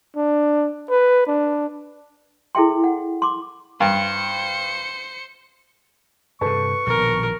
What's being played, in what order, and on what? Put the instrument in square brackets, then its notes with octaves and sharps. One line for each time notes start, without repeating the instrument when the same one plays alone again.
[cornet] D4
B4
D4
[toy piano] E4 G#4 A4 E5 G5 C6
F#5
C6 D6
[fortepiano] G2 [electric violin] C5 C#7
[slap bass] G2 C3 [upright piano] A4 B4 A5 [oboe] C#6
[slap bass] A#1 B2 D#3 [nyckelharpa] A#4